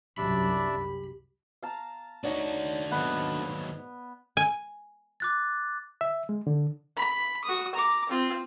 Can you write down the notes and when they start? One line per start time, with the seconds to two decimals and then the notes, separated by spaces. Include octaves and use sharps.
0.18 C2 F#2 D4 G4 D5 E5 B5
1.63 F5 A5 A#5
2.24 D4 D#4 F#4 C#5 D5
2.91 D#2 G#2 F#3 B3
4.37 G#5
5.20 D6 F#6 A6
6.01 E5
6.29 G#3
6.47 D3
6.97 B5
7.44 F#4 D#6
7.75 A#5 D6
8.10 C4 F4